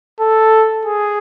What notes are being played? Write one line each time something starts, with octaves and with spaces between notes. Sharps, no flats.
A4
G#4